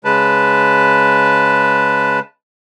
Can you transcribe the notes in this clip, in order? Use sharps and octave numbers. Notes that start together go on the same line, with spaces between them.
C#3 G#3 B4 A5